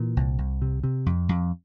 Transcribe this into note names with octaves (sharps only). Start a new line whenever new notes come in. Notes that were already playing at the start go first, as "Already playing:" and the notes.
Already playing: A#2 E3
C2
C2
C3
C3
F2
F2